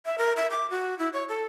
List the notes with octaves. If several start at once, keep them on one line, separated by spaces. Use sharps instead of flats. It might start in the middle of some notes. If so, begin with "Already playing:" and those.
E5
A#4
E5
D6
F#4
E4
C#5
A4